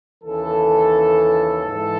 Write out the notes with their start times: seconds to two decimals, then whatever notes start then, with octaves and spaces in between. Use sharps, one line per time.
0.23 D#2 C#3 E3 A4
1.64 G#2 E3 A4